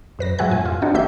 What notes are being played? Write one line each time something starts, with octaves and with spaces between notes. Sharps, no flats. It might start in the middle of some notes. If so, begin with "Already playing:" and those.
F#2 B4 A#6
G#2 F#3 F#4 E5 G#5 F#6
F2 A#2 G#5
F4
C4 D4 D#4 F#4 F#5
A1 A#3 G4 E5 E6 G6